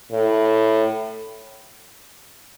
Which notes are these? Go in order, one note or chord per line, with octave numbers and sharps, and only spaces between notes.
A2